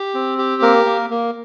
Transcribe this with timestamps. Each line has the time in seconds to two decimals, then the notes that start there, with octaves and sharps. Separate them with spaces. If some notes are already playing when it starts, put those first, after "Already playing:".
Already playing: G4
0.14 C4
0.38 G4
0.62 A#3 A#4
0.85 A#3
1.10 A#3